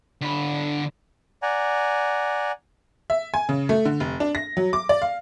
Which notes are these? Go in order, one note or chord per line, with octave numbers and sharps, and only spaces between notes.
D3 B5
D5 F#5 G#5 A#5
E5
G#5
C#3
A3
D3
F1
D4
A#6
F#3
D6
D5
F5